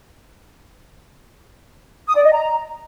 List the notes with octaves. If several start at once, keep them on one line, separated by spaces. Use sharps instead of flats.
D#6
D5
D#5
A#5